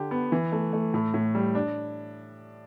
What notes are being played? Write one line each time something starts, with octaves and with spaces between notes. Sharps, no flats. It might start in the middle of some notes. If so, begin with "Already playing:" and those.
Already playing: D3 G4
B3
E3
A3
A3
A2
A2
G3
D4